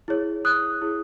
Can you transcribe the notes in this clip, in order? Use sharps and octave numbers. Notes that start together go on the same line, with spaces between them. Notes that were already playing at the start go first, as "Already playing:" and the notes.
E4 G#4 C#5
D#6 F#6
E4 G#4 C#5